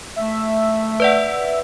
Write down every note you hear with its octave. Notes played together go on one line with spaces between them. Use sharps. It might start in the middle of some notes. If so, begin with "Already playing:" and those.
A3 E5
B4 D5 F#5